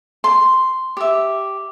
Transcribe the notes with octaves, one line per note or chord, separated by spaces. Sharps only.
C6
G4 E5